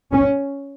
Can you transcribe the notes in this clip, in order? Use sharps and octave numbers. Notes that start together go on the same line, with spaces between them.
C#4